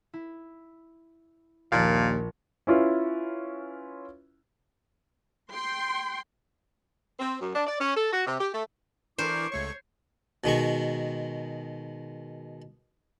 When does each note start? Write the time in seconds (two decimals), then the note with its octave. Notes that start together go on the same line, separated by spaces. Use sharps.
0.13 E4
1.72 A#1 D#2 A#2 D5 F5 A5 A6
2.67 C#4 E4 F4 B4
5.52 G5 C6
7.19 C4
7.41 F#2
7.54 D4
7.67 D5
7.80 C#4
7.96 A4
8.12 F#4
8.27 C3
8.39 G4
8.53 A3
9.18 E3 D4 E4 A#4 C5 C#6 D6
9.52 C#2 A3 C#5 C#6
10.44 B2 D#3 G#3 C#6